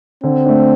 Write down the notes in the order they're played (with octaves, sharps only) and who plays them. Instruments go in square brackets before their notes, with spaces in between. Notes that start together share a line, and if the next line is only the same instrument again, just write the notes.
[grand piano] D3 [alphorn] C4
[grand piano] A3 D4